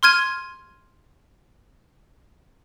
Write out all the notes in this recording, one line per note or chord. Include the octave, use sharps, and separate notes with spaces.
C6 F6 G#6 D#7